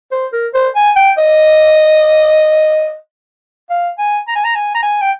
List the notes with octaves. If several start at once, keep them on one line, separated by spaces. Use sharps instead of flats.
C5
A#4
C5
G#5
G5
D#5
F5
G#5
A#5
G#5
A#5
G#5
A#5
G#5
G5